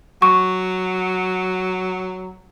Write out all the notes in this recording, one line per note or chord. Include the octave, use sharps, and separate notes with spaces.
F#3 C#6